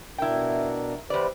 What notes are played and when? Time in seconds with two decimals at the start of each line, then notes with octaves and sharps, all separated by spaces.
0.18 B2 D4 E4 A#4 G5
1.10 E2 G4 B4 C5 D5